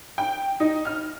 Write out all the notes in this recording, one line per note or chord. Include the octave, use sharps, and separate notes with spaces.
G5
D#4
F6